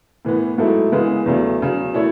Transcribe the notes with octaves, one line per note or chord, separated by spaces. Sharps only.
A2 E3 B3
G#2 F#3 A3 E4 A4
C#3 E3 G#3 B3
E2 C#3 F#3 A3
E2 C#3 F#3
B2 A3 E4 A4 C#5